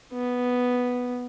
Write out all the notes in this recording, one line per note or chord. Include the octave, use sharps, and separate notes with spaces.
B3